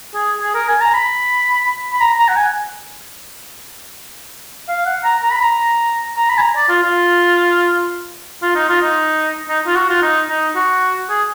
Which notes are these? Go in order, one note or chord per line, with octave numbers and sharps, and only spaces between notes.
G#4
G#4
A#4
G#5
A#5
B5
B5
A#5
A#5
F#5
G#5
F5
F#5
A#5
A#5
B5
A#5
A#5
B5
G#5
A#5
D5
F4
F4
F4
D#4
F4
D#4
D#4
F4
F#4
F4
D#4
D#4
F#4
G#4